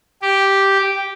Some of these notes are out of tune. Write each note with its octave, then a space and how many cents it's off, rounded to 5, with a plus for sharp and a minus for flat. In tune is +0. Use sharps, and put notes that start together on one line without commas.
G4 -5